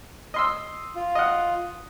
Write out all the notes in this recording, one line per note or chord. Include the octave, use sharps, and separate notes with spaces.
D#5 C6 E6
F4
D#5 F#5